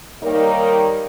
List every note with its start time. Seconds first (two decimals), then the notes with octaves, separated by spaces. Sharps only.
0.22 D#3 G3 A#3 D#4 A#4 C#5